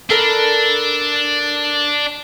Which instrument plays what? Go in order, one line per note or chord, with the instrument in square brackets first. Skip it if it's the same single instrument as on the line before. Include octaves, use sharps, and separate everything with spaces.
[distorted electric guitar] D4 [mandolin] A4 A#4 B5